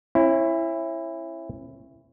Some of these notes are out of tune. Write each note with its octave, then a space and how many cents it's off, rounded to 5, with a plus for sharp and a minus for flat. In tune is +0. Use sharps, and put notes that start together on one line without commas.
C#4 -40 E4 +10